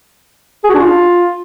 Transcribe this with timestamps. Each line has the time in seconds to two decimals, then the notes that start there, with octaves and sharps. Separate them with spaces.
0.64 G#4
0.69 F#4
0.74 D4
0.79 F4